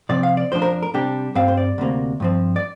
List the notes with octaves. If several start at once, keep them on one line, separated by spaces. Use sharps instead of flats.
C3 F3 C4 D5
F5
D5
F2 F3 D4 C5
A#4
A#4
C3 G3 D4 G4
G2 G3 C4 F5
C5
D5
D2 C3 A#3
G2 F3 C4
D5